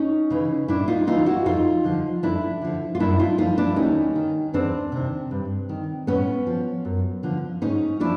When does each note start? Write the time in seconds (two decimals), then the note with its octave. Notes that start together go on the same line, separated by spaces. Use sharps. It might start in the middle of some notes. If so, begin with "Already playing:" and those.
Already playing: C#4 D#4
0.30 C#3 E3
0.68 A2 D4 E4
0.88 D#4 F4
1.07 E3 D#4 F4
1.26 E4 F#4
1.46 F2 D#4 F4
1.84 D3 F3
2.23 F2 D4 E4
2.62 D3 F3
2.95 F4
3.00 F#2 D4 E4
3.19 D#4 F4
3.38 D3 F3 D#4 F4
3.58 D4 E4
3.76 D#2 C#4 D#4
4.16 D#3
4.53 E2 C4 D4
4.92 C3 D#3
5.31 G2
5.69 D#3
6.07 A2 B3 C#4
6.47 F3
6.85 F#2
7.23 D3 F3
7.61 G#2 C#4 D#4
8.00 F3 D4 E4